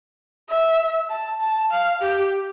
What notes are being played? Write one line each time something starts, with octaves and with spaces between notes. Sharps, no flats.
E5
A5
A5
F5
G4